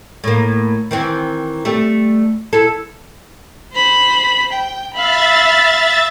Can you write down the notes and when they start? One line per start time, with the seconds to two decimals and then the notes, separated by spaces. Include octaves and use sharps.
0.24 A2 A#3
0.91 D#3 E3 C4
1.65 G3 A3
2.53 E4 A4
3.73 C5 B5
4.53 G5
4.95 E5 F5 B5 A6